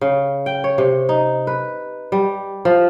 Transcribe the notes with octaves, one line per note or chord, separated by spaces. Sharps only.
C#3
G5
C#5
C3
D#4
B4
G3
F3